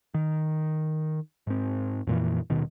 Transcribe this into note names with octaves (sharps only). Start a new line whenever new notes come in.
D#3
G#2 C4
F2 A#2 E3
D#1 B2 D#3